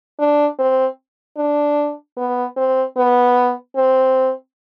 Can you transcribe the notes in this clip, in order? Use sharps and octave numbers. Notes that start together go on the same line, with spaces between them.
D4
C4
D4
B3
C4
B3
C4